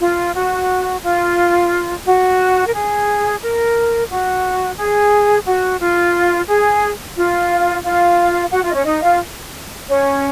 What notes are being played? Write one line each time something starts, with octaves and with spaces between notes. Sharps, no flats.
F4
F#4
F4
F#4
A#4
G#4
A#4
F#4
G#4
F#4
F4
G#4
F4 F5
F4 F5
F#4 F#5
F4 F5
D#5
C#4 C#5
D#4 D#5
F4 F5
C#4 C#5